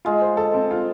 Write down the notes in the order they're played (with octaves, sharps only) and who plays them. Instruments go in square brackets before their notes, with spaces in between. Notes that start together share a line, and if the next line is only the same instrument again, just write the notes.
[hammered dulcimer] G#3 [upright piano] F4
[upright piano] C5
A4
C4
F4